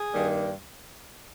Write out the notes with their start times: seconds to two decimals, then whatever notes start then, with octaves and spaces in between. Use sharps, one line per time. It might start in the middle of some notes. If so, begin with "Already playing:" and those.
Already playing: G#4
0.12 G2 D#3 G3 A#3